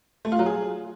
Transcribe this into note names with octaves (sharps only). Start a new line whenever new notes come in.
A3
F4
F#3
G#4